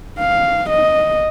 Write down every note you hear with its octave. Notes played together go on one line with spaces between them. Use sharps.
F5
D#5